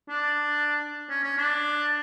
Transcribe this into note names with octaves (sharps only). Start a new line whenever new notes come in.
D4
C#4
C#4
D4